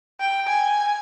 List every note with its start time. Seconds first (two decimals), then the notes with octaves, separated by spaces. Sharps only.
0.20 G5
0.48 G#5